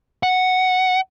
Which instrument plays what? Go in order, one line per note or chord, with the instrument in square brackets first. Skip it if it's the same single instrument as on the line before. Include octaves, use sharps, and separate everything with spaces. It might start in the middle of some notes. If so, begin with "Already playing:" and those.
[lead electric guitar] F#5